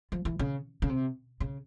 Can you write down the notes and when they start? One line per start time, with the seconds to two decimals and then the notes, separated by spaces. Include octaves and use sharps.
0.12 F3
0.25 E3
0.39 C#3
0.82 C#3
0.89 C3
1.40 C#3